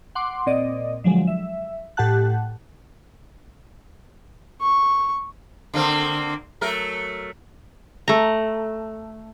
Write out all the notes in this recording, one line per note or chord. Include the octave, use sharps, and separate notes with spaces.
F#5 C6 D6
A#2 C4 D5 D#5
D3 F3 F#3 G#3
E5
A2 G4 F#5 A5 F#6
C#6
D3 A#3 C4
F#3 A3 A#4
A3 A#5